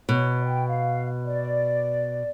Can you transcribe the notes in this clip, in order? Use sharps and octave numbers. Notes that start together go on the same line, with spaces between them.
B2 C#5
G5
F5
D5